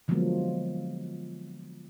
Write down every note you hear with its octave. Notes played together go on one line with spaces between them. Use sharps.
D3 F3 F#3 G#3 A#3 B3